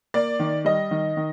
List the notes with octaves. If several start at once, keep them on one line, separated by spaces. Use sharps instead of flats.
A#3 D5
D#3
G3 D#5
D#3
D#3